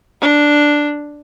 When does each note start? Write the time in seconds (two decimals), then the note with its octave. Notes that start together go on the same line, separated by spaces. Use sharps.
0.21 D4